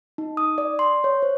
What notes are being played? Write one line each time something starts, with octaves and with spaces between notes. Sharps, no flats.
D#4
D#6
D5
C6
C#5
C5